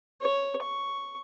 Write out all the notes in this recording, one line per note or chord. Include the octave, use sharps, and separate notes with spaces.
C#5
C#6